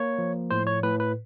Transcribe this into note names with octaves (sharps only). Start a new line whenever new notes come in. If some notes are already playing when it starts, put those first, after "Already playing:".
Already playing: A#3 C#5
F3
A2 C5
C#5
A2 B4
B4